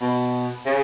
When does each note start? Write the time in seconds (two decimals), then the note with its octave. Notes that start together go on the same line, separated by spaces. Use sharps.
0.01 B2
0.66 C#3